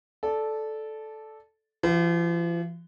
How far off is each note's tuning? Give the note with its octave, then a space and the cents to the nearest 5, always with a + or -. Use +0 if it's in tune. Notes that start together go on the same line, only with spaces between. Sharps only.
A4 -10 D5 +0
F3 -45 F#4 +0